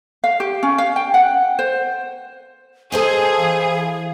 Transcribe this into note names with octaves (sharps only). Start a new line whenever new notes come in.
F5
G4
C#4
F5
G5
F#5
C5
G#4 A4 C5 D#5 A5
E3 F5